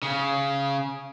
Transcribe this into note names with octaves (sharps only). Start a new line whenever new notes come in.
C#3